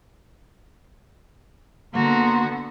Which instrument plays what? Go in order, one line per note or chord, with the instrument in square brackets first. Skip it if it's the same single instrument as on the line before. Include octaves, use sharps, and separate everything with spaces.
[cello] D3 B3 [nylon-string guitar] A#3 [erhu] F#4 [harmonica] A#5 C6